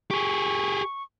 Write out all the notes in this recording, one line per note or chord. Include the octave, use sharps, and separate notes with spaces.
G4 G#4 C#6